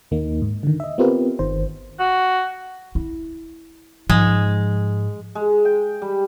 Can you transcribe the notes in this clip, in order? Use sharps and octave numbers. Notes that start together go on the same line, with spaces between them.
D#2 A#3 D#4
G#2
D3 D#3
D#5 E5
B3 C4 F4 G4 A#4 B4
G1 D#3 C5
F#4
E4
G#2 F3 G#3
G#3
G5
G3